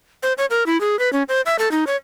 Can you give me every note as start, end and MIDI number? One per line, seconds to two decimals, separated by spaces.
0.23 0.33 72
0.38 0.46 73
0.50 0.66 70
0.66 0.80 64
0.81 0.99 68
0.99 1.12 71
1.13 1.23 61
1.29 1.41 72
1.46 1.56 76
1.59 1.71 69
1.71 1.84 63
1.87 1.96 73